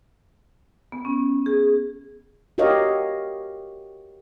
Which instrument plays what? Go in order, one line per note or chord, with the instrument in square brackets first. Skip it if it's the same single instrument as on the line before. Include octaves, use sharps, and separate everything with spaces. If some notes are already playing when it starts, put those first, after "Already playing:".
[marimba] B3
C#4
G#4
[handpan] F#4 G4 A#4 C#5 D#5 F5